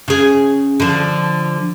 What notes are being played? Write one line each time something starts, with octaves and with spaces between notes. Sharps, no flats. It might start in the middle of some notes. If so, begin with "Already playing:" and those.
C#3 G#4
D3 F3